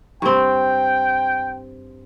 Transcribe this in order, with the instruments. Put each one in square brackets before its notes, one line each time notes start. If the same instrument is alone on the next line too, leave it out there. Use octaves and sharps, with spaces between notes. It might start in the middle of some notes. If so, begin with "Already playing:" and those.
[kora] G2 C4 [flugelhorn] G5